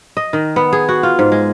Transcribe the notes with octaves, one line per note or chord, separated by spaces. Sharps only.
D#5
D#3
B3
G#4
F#4
F4
G#2
G#3